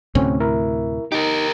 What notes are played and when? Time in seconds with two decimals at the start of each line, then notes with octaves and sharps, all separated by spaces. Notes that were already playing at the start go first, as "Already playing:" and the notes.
0.15 D2 A2 C3 C4 C#4
0.40 E4 A#4 E5
1.12 D#4 G4 A#4